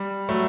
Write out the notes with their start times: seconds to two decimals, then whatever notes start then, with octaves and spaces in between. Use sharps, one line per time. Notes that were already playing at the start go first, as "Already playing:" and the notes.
Already playing: G3
0.29 F#3 A3